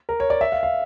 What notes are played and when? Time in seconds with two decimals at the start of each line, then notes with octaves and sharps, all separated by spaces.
0.09 A#4
0.20 C#5
0.30 D5
0.41 E5
0.52 F5
0.63 F5